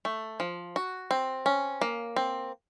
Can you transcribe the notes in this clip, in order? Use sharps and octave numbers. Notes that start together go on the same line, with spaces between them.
A3
F3
F#4
C4
C#4
A#3
C4